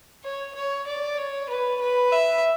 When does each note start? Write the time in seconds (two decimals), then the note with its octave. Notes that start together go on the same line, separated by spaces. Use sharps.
0.24 C#5
0.55 C#5
0.87 D5
1.18 C#5
1.50 B4
1.81 B4
2.12 E5